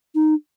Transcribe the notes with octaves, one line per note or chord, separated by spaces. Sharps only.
D#4